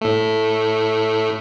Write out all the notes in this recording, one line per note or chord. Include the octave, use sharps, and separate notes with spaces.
A2 A3